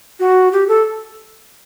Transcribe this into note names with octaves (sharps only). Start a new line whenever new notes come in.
F#4
G4
A4